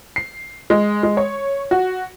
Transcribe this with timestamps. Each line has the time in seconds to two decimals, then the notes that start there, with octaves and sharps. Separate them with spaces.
0.16 C7
0.70 G#3
1.03 G#3
1.17 C#5
1.71 F#4